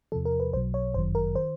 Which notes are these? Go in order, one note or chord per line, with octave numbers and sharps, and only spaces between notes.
E2 C3 F3 A4
A#4
B4
B1 B2 F#3 C5
C#5
G1 F#2 D#3 F#3 C5
A#4
D#3 C5